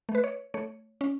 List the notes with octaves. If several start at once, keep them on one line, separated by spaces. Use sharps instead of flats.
A3
B4
C#5
A3 C#5
C#4